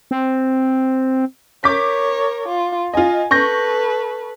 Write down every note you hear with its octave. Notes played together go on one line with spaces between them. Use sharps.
C4
A#4 C#5 D6 G6 B6
F4
F4 D#5 G#5
A4 B4 C#6 G6 A#6